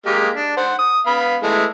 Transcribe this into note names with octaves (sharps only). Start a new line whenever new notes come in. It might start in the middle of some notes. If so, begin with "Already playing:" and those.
G#3 A#3 G4
D4
C5 F#5
D#6
B3 F5 B5
E3 G#3 A3